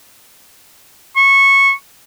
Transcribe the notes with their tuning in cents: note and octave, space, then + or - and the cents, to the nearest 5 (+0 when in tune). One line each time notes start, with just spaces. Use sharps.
C#6 -15